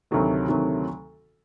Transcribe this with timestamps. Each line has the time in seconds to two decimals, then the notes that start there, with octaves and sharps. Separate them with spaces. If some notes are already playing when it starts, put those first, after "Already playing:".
0.11 D2 C3 D#3 F#3 A3
0.49 D2 C3 D#3 F#3 A3